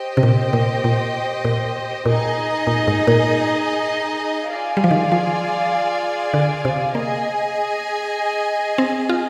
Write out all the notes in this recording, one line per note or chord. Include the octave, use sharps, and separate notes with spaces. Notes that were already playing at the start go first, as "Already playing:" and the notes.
Already playing: G4 C5 D#5 G5
C3
A#2
A#2
A#2
A#2
A#2 D#4 G#4 D#5
A#2
G#2
A#2
F4 G#4 D5 F5 G#5
G3
F3
D#3
F3
D3
C3
A#3 G#4 D#5 G#5
C4
F4